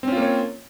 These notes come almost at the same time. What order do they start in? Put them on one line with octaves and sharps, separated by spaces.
C4 C#4 F4 A#3 C#5